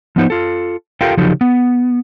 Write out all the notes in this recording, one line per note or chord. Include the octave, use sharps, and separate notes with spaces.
F3 B3 D#4 C5
F4 A4
F4 G4 A4 A#4 F5 G5
C#3 F3 F#3 D#4 G4 A4
B3